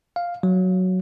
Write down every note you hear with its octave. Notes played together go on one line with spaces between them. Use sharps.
F5
F#3